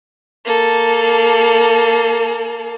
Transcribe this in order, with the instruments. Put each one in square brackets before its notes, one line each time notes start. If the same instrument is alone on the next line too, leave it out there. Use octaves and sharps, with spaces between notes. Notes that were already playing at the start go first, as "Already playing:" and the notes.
[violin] A#3 A4